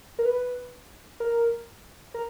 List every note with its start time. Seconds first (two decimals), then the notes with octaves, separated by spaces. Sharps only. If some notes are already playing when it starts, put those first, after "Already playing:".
0.19 A#4
0.25 B4
1.20 A#4
2.14 A#4